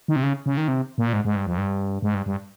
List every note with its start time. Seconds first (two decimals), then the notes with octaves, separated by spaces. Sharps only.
0.08 D#3
0.16 C3
0.23 C#3
0.46 C#3
0.57 D#3
0.68 C3
0.98 A#2
1.13 G#2
1.25 G#2
1.36 G2
1.47 F2
1.58 G2
2.02 G#2
2.14 G2
2.26 G2